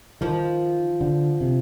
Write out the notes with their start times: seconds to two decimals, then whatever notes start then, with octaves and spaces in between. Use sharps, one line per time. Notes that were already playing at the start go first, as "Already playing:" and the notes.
0.21 D#3 F3
1.01 D3
1.41 C3